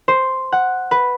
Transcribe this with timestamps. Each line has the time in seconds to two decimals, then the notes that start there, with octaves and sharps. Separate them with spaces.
0.08 C5
0.52 F#5
0.91 B4